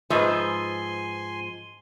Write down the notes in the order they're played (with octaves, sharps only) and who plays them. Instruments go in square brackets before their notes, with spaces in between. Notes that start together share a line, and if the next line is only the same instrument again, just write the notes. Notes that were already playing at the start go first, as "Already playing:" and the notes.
[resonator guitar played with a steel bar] G#2 F3 [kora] B4 D#5 E5 [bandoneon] G#5 C6